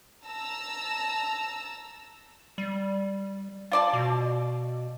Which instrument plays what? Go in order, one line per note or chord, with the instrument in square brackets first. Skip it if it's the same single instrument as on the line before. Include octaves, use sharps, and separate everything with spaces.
[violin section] A5 A#5 E6
[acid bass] G3
[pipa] F4 D5 A5
[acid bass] B2